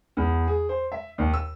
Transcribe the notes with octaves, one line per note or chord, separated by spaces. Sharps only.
E2
G#4
C5
E5
D#2
E6